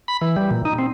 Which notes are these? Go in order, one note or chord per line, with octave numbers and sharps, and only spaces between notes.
B5
E3
G3
A#2
D#4
C4